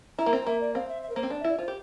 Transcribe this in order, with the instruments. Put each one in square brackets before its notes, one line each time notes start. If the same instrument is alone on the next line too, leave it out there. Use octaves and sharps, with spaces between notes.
[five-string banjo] E4 [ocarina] A#5
[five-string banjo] A#3
C4
[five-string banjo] A#3 [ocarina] E5
[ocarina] D5
[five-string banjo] C4 [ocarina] F5
[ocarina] E5
E5
A#4
[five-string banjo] A#3 [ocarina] C5
[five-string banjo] C4
[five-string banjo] D4 [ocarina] D5
[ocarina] E5
[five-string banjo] E4
[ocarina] D5
[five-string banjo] F4 [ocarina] C5
[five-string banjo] G4